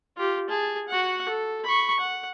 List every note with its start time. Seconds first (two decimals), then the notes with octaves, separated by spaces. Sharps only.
0.17 F4 G4
0.49 G#4 A5
0.88 F#4 F#5
1.29 A4
1.64 B5 C#6
2.00 F#5